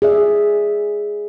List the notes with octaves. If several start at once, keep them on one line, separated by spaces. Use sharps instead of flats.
G#4 D5 E5